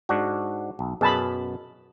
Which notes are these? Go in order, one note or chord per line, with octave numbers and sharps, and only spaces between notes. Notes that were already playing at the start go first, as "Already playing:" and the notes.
G#2 D4 F#4
B1
F#2 B2 G#4 A5 B5